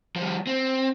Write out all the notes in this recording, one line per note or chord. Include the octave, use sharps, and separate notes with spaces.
F3 G3
C4